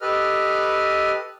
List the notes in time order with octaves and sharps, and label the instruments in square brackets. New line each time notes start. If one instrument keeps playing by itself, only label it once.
[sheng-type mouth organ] G4 A4 B4 D#5 F6